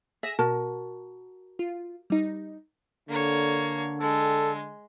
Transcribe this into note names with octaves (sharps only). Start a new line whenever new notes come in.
G#4 E5 A#6 E7
B2 F#4 A#4 A5
F4
G3 D#4
D3 A#3 C#5
G#3 A4